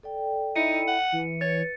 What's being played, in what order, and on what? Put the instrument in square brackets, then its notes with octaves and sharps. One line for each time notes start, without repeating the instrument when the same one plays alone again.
[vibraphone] A4 D5 G5
[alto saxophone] D#4 [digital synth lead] E4 [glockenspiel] C#7 D#7
[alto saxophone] F#5
[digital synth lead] E3
[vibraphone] B4 [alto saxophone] C#5 [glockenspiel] A6